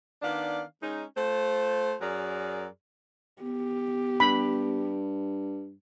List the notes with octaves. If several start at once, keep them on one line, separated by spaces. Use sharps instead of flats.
D#3 B3 D4 D5 F5
G#3 C#4 D#4
A3 F4 C5
F#2 F#3 G#4 A#4 D5
B3 G4
G2 B5